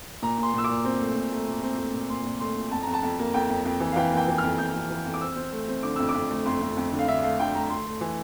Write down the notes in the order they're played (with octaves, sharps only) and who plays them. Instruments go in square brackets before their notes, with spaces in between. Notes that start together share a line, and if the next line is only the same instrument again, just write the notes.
[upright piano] A#2 A#5
A#2 C6
A#2 E6
A#2 D6
C4
A3
A#2
A3
A#2
C4
A3
A#2
A#2 C6
A#2
A3 C6
A#2
F2 A5
F2 A#5
A5
F2
A#3
F2 G5
F2
F2
E3
F5
E3 G5
A#3 G5
E3
F6
F2
F2 G6
F2
E3
F2
D6
C4 E6
C4
A3
C4
D3 D6
F2 E6
D6
F2
A3
F2 C6
F2
F2
D3
F5
D3 E5
A3 F5
D3 G5
A3 A#5
A3 C6
A3
E3